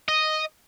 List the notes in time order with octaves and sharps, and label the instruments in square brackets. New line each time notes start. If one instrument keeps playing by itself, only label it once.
[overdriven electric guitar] D#5